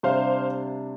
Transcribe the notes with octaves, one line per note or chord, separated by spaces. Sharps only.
C3 G3 D4 C5 F5